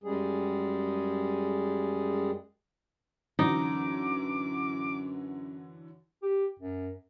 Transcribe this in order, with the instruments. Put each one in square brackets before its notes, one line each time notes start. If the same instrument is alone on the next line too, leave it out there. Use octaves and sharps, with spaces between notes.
[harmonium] F#2 G3 G#3 G#4
[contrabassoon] F#2 [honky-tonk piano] D3 E3 F#3 [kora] D#4 [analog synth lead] D6
[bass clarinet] G4
F#2